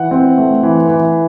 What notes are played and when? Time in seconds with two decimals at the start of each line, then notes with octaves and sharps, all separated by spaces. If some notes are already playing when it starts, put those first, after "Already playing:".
Already playing: E3 F#5
0.11 C4
0.37 A3
0.63 E3
0.89 E3